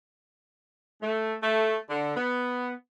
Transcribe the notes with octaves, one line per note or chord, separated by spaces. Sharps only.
A3
A3
D3
B3